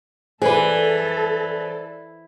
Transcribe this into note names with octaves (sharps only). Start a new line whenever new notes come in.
E3 G#4 A4 B4 C5 D5